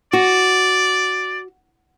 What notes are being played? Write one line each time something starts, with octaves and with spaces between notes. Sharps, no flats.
F#4 D5